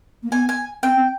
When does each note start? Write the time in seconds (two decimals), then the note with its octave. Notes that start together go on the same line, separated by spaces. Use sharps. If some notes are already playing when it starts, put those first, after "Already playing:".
0.23 A#3
0.32 B3 G#5
0.49 G#5
0.83 C4 G5
0.96 C4